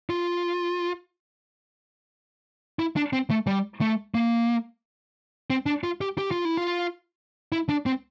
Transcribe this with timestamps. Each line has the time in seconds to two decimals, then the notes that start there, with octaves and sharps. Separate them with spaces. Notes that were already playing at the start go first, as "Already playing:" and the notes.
0.10 F4
2.79 E4
2.96 D4
3.13 C4
3.30 A3
3.47 G3
3.81 A3
4.14 A#3
5.50 C4
5.66 D4
5.84 F4
6.01 G4
6.18 G4
6.31 F4
6.45 E4
6.57 F4
7.52 E4
7.69 D4
7.86 C4